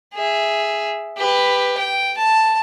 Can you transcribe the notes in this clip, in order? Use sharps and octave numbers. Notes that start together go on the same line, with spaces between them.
G#4 E5
G4 B4
G5
A5